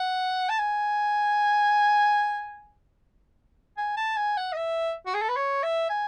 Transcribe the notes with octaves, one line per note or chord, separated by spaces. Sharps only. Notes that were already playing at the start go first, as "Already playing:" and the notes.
Already playing: F#5
A5
G#5
G#5
A5
G#5
F#5
D#5
E5
F#4
G#4
A4
B4
C#5
E5
G#5